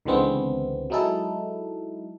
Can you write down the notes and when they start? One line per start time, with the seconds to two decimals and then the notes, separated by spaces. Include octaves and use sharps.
0.05 C#2 D3 E3 G#3 B3 C4
0.90 F#3 G#3 D#4 E4 A4